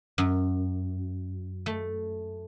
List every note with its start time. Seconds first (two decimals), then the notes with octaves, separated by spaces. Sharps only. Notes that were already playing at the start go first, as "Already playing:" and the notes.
0.18 F#2
1.66 A3